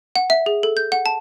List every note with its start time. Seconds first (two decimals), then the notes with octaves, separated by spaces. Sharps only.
0.16 F#5
0.30 E5
0.46 G#4
0.63 A4
0.77 G6
0.92 F#5
1.06 A5